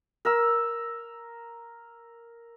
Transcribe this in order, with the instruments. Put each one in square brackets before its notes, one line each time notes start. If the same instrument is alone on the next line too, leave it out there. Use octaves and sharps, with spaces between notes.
[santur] A#4 E6